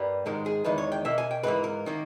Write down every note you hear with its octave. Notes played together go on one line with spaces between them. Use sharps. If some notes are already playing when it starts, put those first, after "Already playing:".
Already playing: G2 G3 A#3 B4
G#2 D#3 G#3 A#4
G#4
E2 D#3 G#3 B4
C#5
G5
B2 A#3 E5
G#5
G5
G#2 E3 A#3 B4
A#4
D#3 A#3